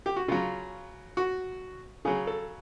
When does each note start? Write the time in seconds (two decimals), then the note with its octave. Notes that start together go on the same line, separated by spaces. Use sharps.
0.06 G4
0.16 F#4
0.28 C#3 F#3 F4
1.17 F#4
2.05 C#3 F#3 G#4
2.27 A4